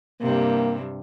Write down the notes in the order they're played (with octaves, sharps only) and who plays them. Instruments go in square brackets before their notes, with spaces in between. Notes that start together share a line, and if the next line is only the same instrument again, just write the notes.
[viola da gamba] G2 C3 [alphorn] A#3